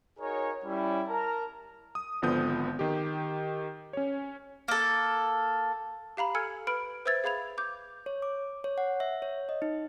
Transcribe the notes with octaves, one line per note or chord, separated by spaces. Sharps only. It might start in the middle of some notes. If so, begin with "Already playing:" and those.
D#4 F#4 G#4 A#4 C#5
G3 C#4 E4
A#4 A5 A#5
D#6
G#1 D3 F3 B3 D#6 G6
D#3 G4
C#4 C#5
A#3 A4
G4 F5 A#5 B5
A4 G#5 E6 F6 G#6 C#7
B4 B5 F6 D7
B4 C5 E5 E6 G#6 A6
G#4 F5 B5 G#6 F7
D6 G6
C#5
D6
C#5
F#5
E5
C#5
D#5
D#4